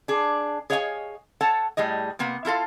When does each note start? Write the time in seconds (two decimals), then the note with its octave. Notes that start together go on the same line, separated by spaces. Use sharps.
0.08 D4 G#4
0.70 G#4 C#5 D#5 F5 G5 G#5
1.41 A4 C#5 F#5 A5
1.77 A2 G3 G#4 D#5
2.19 C3 A#3 B3
2.45 E4 F4 A4 F5